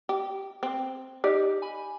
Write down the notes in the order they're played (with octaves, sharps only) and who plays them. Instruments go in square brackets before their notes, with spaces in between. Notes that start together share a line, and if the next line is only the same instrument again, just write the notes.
[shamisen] G4
C4
[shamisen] D#4 D5 [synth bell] G4
[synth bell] G#5 B5